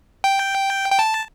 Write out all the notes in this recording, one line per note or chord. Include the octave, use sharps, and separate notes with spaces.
G5
G5
A5